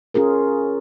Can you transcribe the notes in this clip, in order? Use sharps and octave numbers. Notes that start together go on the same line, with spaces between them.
C#4 F4 G#4 A#4